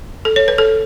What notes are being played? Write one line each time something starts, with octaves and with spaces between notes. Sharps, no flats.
A4
C#5
B4
A4